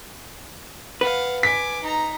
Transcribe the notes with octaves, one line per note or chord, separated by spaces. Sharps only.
B4 F5 F#5
G#5 D6 B6
D#4 A#5